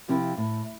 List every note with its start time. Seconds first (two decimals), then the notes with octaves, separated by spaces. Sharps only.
0.08 C3 F3 C4 E4
0.37 A2